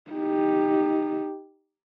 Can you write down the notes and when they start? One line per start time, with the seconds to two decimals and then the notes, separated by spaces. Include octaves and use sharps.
0.11 D#4 G4